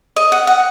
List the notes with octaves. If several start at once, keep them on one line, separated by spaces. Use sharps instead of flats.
D#5
F#5
F#5